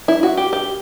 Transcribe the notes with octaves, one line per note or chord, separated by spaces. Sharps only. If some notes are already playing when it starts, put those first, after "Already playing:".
E4
F#4
G4
G4